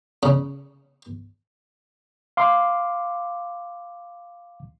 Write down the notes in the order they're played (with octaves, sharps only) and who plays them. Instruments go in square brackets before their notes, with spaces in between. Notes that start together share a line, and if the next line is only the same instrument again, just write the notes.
[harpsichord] C#3
[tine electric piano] F5 C6 D6